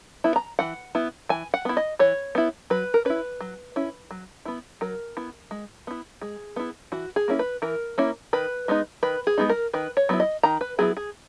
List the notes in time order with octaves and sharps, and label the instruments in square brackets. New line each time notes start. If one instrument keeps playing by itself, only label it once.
[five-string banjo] B3 E4
A#5
E3 F#5
B3 E4
E3 G#5
F#5
B3 E4
D#5
E3 C#5
B3 E4
F#3 B4
A#4
C#4 E4 B4
F#3
C#4 E4
F#3
B3 E4
F#3 A#4
B3 E4
G#3
B3 E4
G#3 G#4
B3 E4
E3 F#4
G#4
A#3 C#4 E4
B4
E3 A#4
A#3 C#4 E4
D#3 B4
G#3 B3 D#4
D#3 B4
G#4
G#3 B3 D#4
A#4
D#3 B4
C#5
F#3 B3 E4
D#5
D#3 A#5
B4
F#3 B3 E4 G#4
G#4